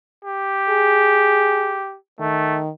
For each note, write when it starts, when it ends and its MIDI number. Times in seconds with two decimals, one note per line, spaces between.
0.25 1.97 67
0.70 1.79 68
2.20 2.69 51
2.20 2.60 57